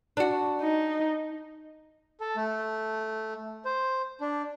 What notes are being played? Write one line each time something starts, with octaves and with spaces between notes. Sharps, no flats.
D4 F#4
D#4
A4
A3
C5
D4